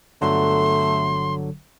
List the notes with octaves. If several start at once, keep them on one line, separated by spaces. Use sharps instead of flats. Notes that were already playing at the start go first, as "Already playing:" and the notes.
G1 D3 F#3 A3 C6